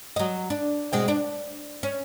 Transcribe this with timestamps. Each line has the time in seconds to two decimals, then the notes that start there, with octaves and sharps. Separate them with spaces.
0.16 F#3 D#5
0.50 D4
0.93 B2 G#3 C4
1.08 D4
1.83 C#4